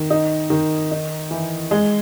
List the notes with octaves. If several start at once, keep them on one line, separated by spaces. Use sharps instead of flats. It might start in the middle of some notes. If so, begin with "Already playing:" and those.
Already playing: D#3
D#4
D#3
D#4
E3
G#3